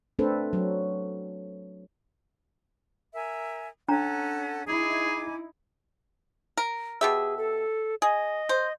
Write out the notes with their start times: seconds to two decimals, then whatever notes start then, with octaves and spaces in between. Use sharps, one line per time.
0.19 A3 C4 D4 A4 B4 C5
0.53 F#3
3.14 A#4 E5 G#5
3.89 C#4 D4 A4 F#5 A#5
4.67 D#4 E4 G#4 G#5 D6 G#6
6.57 A#4
7.01 B2 G4 G#4 E5
7.38 A4
8.02 G#4 D#5
8.49 C5